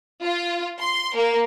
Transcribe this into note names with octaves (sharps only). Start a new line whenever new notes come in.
F4
C6
A#3